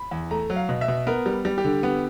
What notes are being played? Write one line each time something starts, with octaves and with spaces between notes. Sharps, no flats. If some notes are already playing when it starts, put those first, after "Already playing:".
Already playing: B5
E2
A3 A#5
F#3
F5
B2
E5
B2
B3 A#4
G3
G3
G4
D3
B3